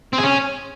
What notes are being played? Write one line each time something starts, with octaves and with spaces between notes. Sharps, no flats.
C4
G#4
C#4